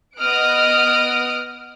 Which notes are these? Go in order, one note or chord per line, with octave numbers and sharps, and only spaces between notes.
B3 D#5 D#6 F6 F#6 D7